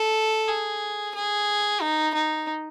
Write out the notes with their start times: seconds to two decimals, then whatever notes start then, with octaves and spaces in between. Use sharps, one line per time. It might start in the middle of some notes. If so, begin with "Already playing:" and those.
Already playing: A4
0.48 G#4
1.15 G#4
1.82 D#4
2.14 D#4